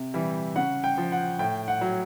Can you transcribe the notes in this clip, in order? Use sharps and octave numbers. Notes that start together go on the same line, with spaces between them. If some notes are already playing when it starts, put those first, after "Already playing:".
Already playing: C3
E3 G3
C#3 F#5
G5
F3
F#5
A2 G5
F#5
F#3